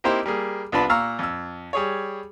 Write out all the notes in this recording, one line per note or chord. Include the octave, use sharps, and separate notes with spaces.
A#3 C4 D#4 E4 G4 C5
G3 A#3 G#4
C2 B3 D4 F4 A5 B5
A#2 F5 A#5 C#6 E6
F2 E6
G3 G#4 C#5